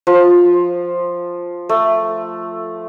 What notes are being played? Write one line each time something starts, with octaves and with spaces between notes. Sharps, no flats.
F3
A3